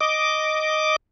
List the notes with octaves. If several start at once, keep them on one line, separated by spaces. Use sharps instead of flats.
D#5 D6